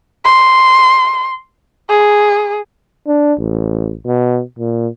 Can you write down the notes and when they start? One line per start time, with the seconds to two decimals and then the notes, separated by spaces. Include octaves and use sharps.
0.24 C6
1.89 G#4
3.07 D4
3.39 A1
4.06 B2
4.59 A#2